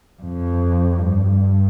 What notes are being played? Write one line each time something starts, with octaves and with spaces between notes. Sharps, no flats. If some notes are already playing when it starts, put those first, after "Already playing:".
F2
G2